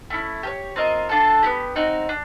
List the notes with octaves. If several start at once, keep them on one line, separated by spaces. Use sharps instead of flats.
A3 C#4 E4
G4 A#4 C#5
C4 F4 A#4 D#5
D4 F4 A4
B3 E4 G4
C4 D#4 F#4
D4